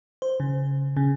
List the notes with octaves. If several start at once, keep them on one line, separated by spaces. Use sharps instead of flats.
C5
C#3
C#3